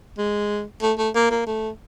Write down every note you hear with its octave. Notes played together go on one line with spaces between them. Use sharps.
G#3
A3
A3
A#3
A#3
A3